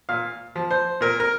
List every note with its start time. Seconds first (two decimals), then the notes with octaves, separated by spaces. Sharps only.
0.09 A#2 F5
0.56 F3
0.71 C5
1.01 A#2 A#4
1.20 A#4